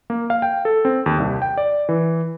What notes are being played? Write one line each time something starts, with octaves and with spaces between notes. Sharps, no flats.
A#3
F5
G5
A4
C4
D#2
C2
G5
D5
E3